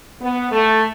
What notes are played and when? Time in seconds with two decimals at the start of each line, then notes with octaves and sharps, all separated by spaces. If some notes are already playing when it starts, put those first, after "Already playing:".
0.21 B3
0.52 A3